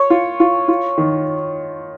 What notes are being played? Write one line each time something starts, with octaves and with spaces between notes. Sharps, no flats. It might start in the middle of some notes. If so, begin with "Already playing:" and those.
Already playing: C#5
F4
F4
F4
D#3